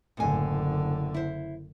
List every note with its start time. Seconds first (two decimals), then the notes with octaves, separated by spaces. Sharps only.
0.17 F#1 A2 D3 G#5
1.14 E4 C5